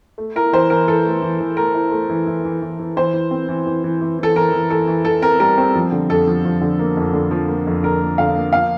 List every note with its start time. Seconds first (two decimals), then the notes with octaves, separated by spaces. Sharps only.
0.18 A3
0.36 E4 A#4
0.53 E3 C5
0.70 E3 A#4
0.88 E3 A4
1.05 A3
1.22 E3
1.40 E3
1.57 A3 A#4
1.75 E4
1.92 A3
2.09 E3
2.27 E3
2.45 E3
2.62 E3
2.79 E3
2.96 E3 C5
3.13 E3
3.31 C4
3.49 E3
3.67 E3
3.84 E3
4.01 E3
4.19 E3 A4
4.36 E3 A#4
4.53 E3
4.70 E3 A4
4.88 E3
5.05 E3 A4
5.22 C4 A#4
5.40 G3 A#4
5.58 C4
5.75 F3
5.92 D3
6.09 F2 A4
6.28 F3
6.45 F3
6.61 D3
6.79 A#3
6.97 F2
7.13 D3
7.31 F3
7.49 A#3
7.67 F2
7.83 D3 A#4
8.01 A#3
8.18 D3 F5
8.36 A#3
8.53 F3 F5